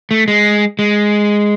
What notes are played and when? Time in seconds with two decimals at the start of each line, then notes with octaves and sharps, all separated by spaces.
0.11 A3
0.28 G#3
0.79 G#3